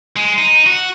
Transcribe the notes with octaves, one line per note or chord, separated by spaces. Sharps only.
G#3
D#4
F#4